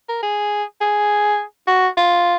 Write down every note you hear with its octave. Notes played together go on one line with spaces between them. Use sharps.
A#4
G#4
G#4
F#4
F4